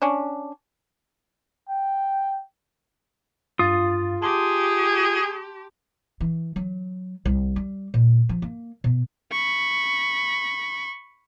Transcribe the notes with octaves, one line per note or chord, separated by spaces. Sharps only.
C#4 D4
G5
G2 F4 F5 D#6 A6
G4 G#4 A5 C6 D6
E3
F#3
C2
G3
A#2
F3
A#3
B2
B5 C#6